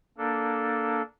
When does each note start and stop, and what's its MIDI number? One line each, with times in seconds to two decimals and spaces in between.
0.18 1.02 58
0.18 1.02 62
0.18 1.02 69